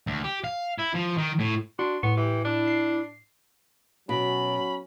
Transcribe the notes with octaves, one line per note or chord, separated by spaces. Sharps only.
D2
G4
F5
E4
F3
D#3
A2
D4 F#4 C6
A2 B3 C#6
E3 G4
D4 E4
C7
B2 F#3 C#4 B5